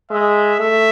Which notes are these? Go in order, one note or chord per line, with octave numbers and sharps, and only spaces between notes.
G#3 E5
A3 E5